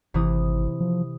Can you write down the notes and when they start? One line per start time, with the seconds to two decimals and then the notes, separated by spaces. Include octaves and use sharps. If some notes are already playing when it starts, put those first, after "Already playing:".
0.14 G#1 C3 E3 D#6
0.81 F3